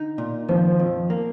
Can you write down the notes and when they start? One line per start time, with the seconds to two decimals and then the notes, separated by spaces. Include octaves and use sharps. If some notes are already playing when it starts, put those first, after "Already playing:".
Already playing: D3 D#4
0.18 A#2
0.49 D#3 F3
0.79 F2
1.10 A#3